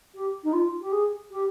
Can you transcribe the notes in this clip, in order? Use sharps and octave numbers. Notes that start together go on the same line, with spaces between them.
G4
D#4
F4
G4
G#4
G4